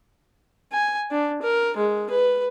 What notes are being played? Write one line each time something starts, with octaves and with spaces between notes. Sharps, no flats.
G#5
D4
A#4
G#3
B4